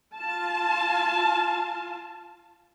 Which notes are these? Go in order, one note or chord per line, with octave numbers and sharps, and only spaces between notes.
F4 A5